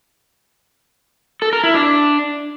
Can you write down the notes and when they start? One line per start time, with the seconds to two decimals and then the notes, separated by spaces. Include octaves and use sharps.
1.42 A4
1.53 A#4
1.63 E4
1.74 D4